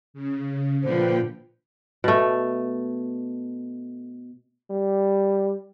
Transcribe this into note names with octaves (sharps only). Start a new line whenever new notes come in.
C#3
A#2 D3 F3 B4 C5 G5
B2 A3
G3